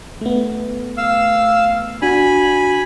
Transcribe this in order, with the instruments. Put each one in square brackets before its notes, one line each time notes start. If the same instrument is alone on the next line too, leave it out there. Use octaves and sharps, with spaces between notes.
[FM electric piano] A3 B3
[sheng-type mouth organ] F5 E6
[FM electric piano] D4 F#4 [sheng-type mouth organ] G#5 B5